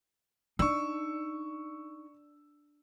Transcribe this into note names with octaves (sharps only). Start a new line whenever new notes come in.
D4 D#4 C#6 E6